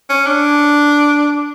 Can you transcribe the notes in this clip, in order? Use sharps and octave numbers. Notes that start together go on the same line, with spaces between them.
C#4
D4